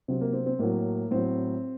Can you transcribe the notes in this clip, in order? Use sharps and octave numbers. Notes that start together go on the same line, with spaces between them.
C3 F#3 C4
A#3
C4
C4
A2 F#3 A#3
A2 F#3 C4